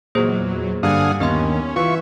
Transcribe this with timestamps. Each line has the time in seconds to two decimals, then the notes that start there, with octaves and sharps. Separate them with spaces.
0.15 E2 A#2 F#3 A#3 G#4 C5
0.83 G2 D3 F5 F#5 G#5 D#6
1.20 D#2 B3 C#4 D#5 C6
1.76 E3 F4 E5 C#6